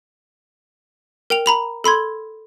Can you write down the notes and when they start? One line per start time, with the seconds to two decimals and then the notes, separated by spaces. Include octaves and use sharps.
1.30 A#4 G5 F7
1.46 A#5 B5 F7
1.84 A4 B5 C6 G#6